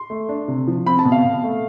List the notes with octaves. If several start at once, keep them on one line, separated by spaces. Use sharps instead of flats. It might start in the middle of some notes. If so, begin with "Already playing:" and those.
Already playing: C6
A3
D4
C3
F3
C4 B5
A5
B2
F5
B2
A3